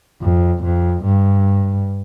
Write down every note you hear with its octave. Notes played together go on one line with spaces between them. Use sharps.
F2
F2
G2